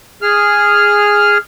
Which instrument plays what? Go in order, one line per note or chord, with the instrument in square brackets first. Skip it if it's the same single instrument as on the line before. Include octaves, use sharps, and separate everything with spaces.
[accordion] G#4 F6